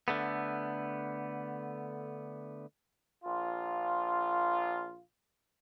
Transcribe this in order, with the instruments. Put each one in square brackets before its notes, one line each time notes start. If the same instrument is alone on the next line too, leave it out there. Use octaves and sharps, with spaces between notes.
[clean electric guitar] D3 A3 B3
[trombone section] A#1 F4